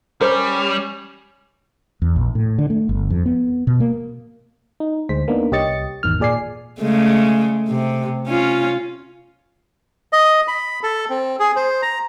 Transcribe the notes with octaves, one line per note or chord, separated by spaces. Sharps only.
G3 C#4 A#4 C5
E2
A#1
A2
D3
A3
G1
F2
B3
B2
A#3
D#4
D2 G#3 C5 B6
A#3 B3 D4 D#4
C2 G4 C#5 D#5 A6 C#7
G#1 E2 D#3 F6
A#2 G#4 D5 G#5 C7
C#3 G#3 A3
C3
C#4 F4
D#5
B5
A4
C4
G#4
C5
A#5